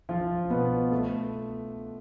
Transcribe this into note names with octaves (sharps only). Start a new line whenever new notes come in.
F3 F4
B2 B3
A3